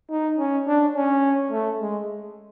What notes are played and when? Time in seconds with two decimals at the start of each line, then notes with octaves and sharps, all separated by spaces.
0.11 D#4
0.38 C#4
0.67 D4
0.95 C#4
1.51 A3
1.79 G#3